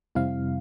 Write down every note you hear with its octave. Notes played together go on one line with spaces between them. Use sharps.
F2 C3 G3 C4 E4 F5